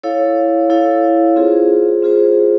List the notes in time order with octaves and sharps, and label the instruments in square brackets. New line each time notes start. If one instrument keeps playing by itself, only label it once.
[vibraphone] E4 A4 C#5 F5
E4 A4 C#5 F5
C4 F4 G#4 C5
C4 F4 G#4 C5